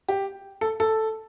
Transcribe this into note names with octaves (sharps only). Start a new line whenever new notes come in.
G4
A4
A4